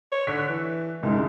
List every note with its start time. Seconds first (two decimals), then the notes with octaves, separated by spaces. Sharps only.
0.12 C#5
0.27 D3 C#6 F#6 B6
0.49 E3
1.03 C2 F#2 D#3 G#3